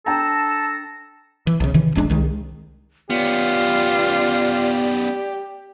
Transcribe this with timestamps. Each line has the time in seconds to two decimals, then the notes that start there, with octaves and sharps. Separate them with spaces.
0.06 D4 A4 G5 A5 A#5 A#6
1.47 E3
1.60 B1 C#3
1.74 C3 D#3 E3
1.95 E1 A1 G#3 D4
2.10 C2 D#3 G#3
3.10 B3 C#4 F4 G4 D5